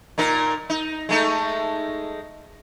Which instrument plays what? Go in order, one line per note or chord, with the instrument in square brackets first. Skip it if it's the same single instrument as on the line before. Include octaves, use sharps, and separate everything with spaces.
[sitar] A#2 D#4 A#4
D#4
G#3 A3 D#4